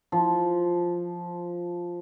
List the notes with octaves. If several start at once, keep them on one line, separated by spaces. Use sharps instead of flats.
F3